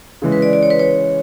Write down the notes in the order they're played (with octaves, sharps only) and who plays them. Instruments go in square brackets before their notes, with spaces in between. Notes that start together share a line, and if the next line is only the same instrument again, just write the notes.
[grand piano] C#3 E3 G#3
[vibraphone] B4
D5
D5
C#5
B4
C#5